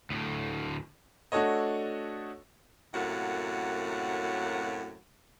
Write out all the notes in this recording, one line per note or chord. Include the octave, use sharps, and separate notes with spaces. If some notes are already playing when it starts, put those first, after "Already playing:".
D2 A2
A3 D4 F#4 A4 C#5 D#5
F#2 A2 C3 A#3 F#4 F#5